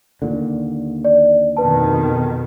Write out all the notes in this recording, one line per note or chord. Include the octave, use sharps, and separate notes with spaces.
D#2 A#2 D3
D5
F2 B2 D#3 B4 A5